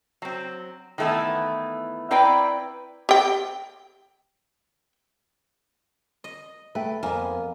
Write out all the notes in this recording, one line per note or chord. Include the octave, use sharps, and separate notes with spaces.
F#3 C4
D#3 E3 A3 B3 E4
C4 E4 B4 D5 G5 A#5
G4 G5
D#5
A3 B4 G5
F2 A#3 B3 G#5